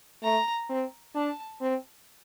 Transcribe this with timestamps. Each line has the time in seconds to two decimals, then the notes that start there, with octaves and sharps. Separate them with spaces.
0.23 A3 A#5
0.69 C4
1.15 D4 A5
1.61 C4